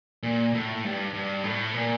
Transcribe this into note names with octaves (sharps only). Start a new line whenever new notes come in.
A#2
A2
G2
G2
A2
A#2